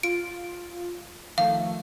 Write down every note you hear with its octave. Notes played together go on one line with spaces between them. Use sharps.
F4 D7
D#3 F3 A3 F5